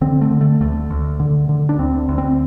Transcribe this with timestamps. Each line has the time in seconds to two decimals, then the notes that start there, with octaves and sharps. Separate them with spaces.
0.01 D3 C4
0.21 A3
0.31 D3
0.41 A3
0.61 D2 A3
0.90 D2
1.20 D3
1.49 D3
1.69 D4
1.79 D2 C4
2.09 D2
2.18 C4